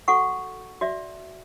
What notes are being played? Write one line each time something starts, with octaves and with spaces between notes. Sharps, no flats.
F#4 A4 F#5 C#6
F#4 D5 E5